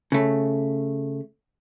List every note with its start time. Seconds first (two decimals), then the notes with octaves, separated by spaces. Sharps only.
0.12 C#3 A3